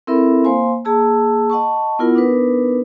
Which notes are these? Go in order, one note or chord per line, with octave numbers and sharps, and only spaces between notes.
C4 E4 A4 A#4 E5 B5
A#3 C5 F5 G#5 C6
A#3 G#4 A5 E6
D#5 F#5 A5 C#6
B3 E4 F4 A#4 F#5
B3 D4 D#4 A#4 B4